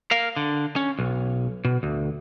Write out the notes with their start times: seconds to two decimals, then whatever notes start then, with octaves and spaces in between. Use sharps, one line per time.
0.11 A#4 F5
0.36 D3
0.76 C#4
0.99 B1
1.65 B2
1.83 D2